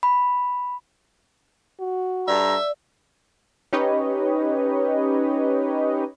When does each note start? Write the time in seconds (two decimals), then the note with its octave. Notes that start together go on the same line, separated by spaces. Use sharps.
0.03 B5
1.80 F#4
2.28 G2 A4 D5 E5 A#5
3.73 C#4 D#4 G4 B4 C#5 D#5